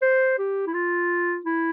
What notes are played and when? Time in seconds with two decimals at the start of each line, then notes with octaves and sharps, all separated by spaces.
0.02 C5
0.38 G4
0.67 E4
0.73 F4
1.45 E4